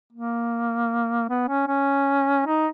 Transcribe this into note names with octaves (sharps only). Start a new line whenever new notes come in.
A#3
B3
C#4
C#4
D#4